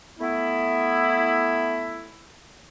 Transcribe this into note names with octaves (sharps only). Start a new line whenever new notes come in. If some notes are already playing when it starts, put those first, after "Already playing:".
A3 B3 E4